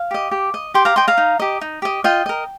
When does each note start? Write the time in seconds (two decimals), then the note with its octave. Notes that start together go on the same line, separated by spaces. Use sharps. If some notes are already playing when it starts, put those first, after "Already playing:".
Already playing: F5
0.11 G4 D#5
0.31 G4
0.54 D#5
0.74 G4 G5 C6
0.85 F5 A#5
0.96 D#5 G5 C6
1.08 F5 A#5
1.17 D#4
1.39 G4 D#5
1.61 D#4
1.82 G4 D#5
2.04 F4 D#5 G5
2.26 A#4 D#5